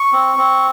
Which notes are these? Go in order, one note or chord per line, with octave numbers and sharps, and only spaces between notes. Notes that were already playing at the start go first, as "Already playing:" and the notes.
Already playing: C#6
C4
C4